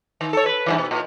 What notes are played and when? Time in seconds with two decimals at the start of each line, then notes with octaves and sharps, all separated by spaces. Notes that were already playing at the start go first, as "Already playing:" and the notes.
0.21 D#3
0.33 A4 C#5
0.46 B4
0.66 G2 C3 E3
0.78 B2
0.91 A#2